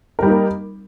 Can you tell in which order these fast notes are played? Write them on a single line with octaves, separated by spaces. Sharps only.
A#4 G3 D#4 A#3